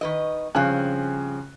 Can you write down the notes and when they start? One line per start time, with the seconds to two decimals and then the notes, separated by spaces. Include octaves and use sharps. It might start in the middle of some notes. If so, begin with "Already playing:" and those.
0.01 D#3 B4 D#5
0.55 G2 C#3 F3 C4 G#5 F#6